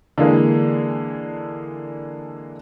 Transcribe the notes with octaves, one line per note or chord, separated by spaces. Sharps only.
D3 E3 G#3 A#3